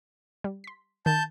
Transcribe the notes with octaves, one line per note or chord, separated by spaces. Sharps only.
G3
C6 B6
D#3 A5 G6